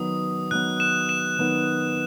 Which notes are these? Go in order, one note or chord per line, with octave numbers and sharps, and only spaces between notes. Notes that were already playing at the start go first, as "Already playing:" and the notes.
Already playing: D#3 F#3 B3 D#6
D#3 F#3 B3 F#6
E7
E7
D#3 F#3 B3